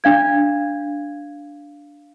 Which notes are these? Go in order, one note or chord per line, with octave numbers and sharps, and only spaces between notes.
D4 F5 G#6